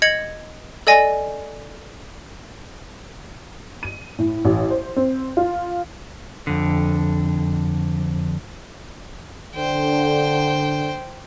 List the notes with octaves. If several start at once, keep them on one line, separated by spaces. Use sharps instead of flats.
D#5 G#6 C#7 F#7
A4 D5 D#5 G#5 A#6
D#7
A2
A1
C5
C4
F4
F2 D3
D3 C5 G5